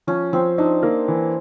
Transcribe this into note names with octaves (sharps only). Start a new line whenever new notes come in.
F3 C#4
F3 C4
D4 D#4
A#3
E3